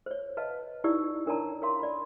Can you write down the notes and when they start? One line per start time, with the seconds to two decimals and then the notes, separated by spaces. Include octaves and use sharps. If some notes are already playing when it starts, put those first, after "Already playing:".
0.06 C5 C#5
0.37 B4 D#5 F5 A5
0.84 D#4 E4 G4 D5 E6
1.26 D4 A#4 C#5 D5 A5 A#5
1.62 A#4 C#5 F5 C6
1.79 D5 B5